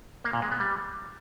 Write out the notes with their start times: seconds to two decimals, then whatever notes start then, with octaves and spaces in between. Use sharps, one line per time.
0.24 A#3
0.33 A#2
0.42 G#3
0.51 B3
0.60 G3